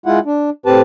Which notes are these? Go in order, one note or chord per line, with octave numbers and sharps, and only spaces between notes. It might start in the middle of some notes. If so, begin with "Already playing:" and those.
G#3 E4 F4 F#5
D4
A2 C4 G4 B4 A5